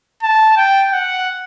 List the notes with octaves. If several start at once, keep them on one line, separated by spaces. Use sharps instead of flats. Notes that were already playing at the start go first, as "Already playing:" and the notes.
A5
G5
F#5